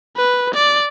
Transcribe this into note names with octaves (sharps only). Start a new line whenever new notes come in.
B4
D5